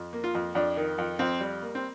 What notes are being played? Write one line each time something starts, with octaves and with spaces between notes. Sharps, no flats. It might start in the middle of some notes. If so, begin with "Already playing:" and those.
Already playing: F2
A#3
F4
F2
F2 D4
D#3
F2
F2 C4
G3
A#3
C4